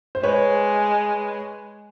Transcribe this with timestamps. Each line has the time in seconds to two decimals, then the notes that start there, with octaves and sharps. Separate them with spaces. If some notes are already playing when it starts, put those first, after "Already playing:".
0.15 C5
0.23 G#3 B4 C#5